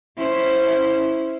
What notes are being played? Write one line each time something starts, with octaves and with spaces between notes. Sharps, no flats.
C#4 E4 C5